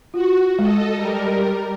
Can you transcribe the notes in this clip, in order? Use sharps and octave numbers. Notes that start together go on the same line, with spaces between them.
F4 F#4
G#3 A4 D#5
G3 A#4